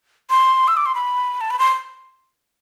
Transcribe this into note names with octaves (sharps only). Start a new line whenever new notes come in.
C6
E6
D6
C6
B5
A5
B5
C6